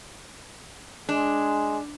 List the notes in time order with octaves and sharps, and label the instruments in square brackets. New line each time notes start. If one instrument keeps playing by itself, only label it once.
[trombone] G#3 [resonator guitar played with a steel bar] D4